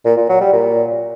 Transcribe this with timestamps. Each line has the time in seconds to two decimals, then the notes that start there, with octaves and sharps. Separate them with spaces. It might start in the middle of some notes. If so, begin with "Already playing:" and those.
0.05 A#2
0.17 A#2
0.29 F#3
0.41 G3
0.53 A#2